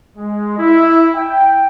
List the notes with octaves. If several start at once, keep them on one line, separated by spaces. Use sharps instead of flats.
G#3
E4
G5